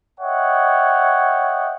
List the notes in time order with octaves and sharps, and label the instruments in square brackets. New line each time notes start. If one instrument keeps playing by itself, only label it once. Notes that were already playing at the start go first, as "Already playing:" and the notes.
[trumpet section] C#5 D#5 E5 F#5 G5